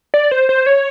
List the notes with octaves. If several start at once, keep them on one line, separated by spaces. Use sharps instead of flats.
D5
C5
C5
C#5